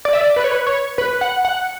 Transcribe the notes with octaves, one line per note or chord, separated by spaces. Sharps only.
D5
E5
D5
B4
C#5
B4
C#5
B4
F#5
F#5